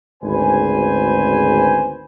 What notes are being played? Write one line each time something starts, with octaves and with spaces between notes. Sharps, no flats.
G#1 D2 C#3 B4 C5 G#5